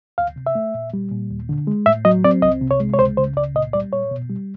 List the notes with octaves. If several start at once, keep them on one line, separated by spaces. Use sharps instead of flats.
D2 F5
C3
E5
A3
A#2
G3
A#2
D#2
D3
G#3
A2 E5
F#3 D#5
C4 D5
C2 D#5
C3
C#5
G#3
C#5
C#2 C5
C#3 C5
C#2 D5
A#2 D#5
G3 D5
A#2 C#5
B2
G3